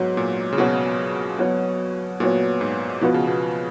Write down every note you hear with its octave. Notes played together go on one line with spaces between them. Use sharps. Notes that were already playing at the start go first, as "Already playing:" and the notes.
Already playing: G#2 F#3 B3 F#4 C#5
A#2
C#3
B2 F#3 B3 F#4 C#5
F#3 B3 F#4 C#5
A#2 F#3 B3 F#4 C#5
G#2
B2 F3 B3 F#4 B4
C#3
B2